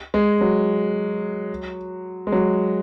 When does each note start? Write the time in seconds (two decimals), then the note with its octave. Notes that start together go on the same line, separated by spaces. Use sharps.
0.14 G#3
0.41 F#3
2.27 G#3
2.32 F#3